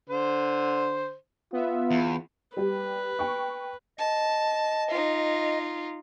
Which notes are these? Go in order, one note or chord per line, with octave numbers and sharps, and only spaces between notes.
D3 C5
B3 F4 E5
E2
G3 G4 B4
G5 C#6
D#5 A5
D#4 F4